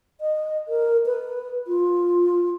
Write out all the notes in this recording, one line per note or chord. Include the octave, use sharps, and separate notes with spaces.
D#5
A#4
B4
F4